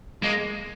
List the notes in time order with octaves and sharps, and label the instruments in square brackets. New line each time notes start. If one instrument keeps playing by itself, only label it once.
[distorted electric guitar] G#3 [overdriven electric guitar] A#3